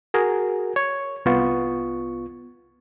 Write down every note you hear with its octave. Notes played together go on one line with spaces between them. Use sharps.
F#4 G#4 A#4
C#5
C2 B3 F4 C#6